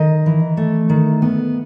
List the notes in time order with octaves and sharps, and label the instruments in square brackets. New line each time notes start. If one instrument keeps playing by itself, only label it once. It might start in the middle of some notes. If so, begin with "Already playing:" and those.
Already playing: [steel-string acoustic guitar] D#3 D#5
E3
A3
D#3
B3